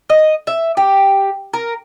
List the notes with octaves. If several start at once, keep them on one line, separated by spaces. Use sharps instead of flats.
D#5
E5
G4
A#4